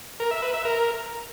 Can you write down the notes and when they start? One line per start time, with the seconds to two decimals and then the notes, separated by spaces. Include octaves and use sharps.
0.20 A#4
0.31 E5
0.42 B4
0.54 E5
0.65 A#4